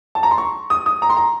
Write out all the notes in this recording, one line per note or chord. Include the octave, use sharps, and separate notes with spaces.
A5
A#5
C6
C#6
D#6
D#6
A#5
C6
A#5